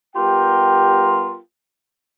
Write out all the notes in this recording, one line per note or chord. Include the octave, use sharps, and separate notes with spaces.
G3 B3 F4 G4 A#4 G5